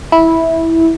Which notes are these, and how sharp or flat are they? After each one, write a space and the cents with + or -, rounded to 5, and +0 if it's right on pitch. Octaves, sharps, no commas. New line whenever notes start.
E4 -10